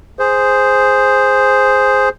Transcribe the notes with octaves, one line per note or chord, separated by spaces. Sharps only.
G#4 C5